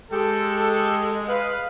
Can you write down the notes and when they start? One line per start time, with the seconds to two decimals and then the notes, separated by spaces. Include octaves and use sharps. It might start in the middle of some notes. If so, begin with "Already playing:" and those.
0.11 G#3 G4 A4
1.28 B4 F5